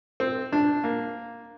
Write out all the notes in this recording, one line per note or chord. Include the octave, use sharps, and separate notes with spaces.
C4
D4
A#3